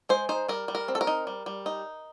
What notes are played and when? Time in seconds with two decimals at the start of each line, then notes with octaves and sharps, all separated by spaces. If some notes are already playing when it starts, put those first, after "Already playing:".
0.09 G#3 C5
0.29 D#4 C5
0.48 G3 A#4
0.68 G3
0.75 A#4
0.88 C4
0.95 A4
1.01 A#4
1.07 D#4
1.27 G3
1.46 G3
1.66 D#4